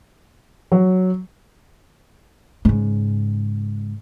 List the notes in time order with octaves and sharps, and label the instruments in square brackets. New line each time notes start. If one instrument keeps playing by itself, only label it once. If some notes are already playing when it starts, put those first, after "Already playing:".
[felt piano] F#3
[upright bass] G#2 C#3